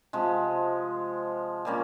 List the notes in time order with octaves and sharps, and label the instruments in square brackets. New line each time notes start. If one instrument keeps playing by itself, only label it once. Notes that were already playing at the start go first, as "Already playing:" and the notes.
[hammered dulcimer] C3 F3 G#3
A#2 G3 A#3 C#4